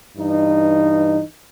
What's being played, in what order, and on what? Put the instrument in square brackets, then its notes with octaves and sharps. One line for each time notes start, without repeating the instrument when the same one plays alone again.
[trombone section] G2 E3 D#4